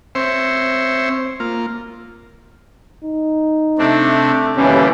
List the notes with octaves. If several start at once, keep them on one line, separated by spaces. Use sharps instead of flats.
C4 C5 C#5 E5
A#3 F4
D#4
C3 A3 C4 D4
D#2 B2 D3 E3 G3 C#4